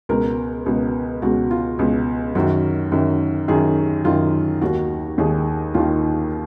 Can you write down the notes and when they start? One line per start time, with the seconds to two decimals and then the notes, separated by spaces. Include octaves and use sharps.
0.09 C#2 B2 A#4
0.66 C#2 B2
1.22 C#2 B2 F#4
1.51 F4
1.79 C#2 B2
2.35 F#2 D#3 F#4
2.92 F#2 D#3
3.48 F#2 D#3 G#4
4.05 F#2 D#3 F4
4.62 D#2 D#3 F#4
5.18 D#2 D#3 G#4
5.74 D#2 D#3 F4